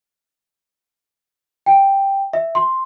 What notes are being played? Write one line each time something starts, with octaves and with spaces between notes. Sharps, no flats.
G5
E5
C6